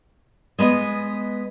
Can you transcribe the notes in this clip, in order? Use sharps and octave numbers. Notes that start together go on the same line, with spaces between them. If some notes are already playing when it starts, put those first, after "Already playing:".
G#3 B3 B4 D#5